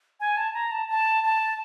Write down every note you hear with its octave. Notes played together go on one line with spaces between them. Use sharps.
G#5
A5
A#5
A5
A5
A5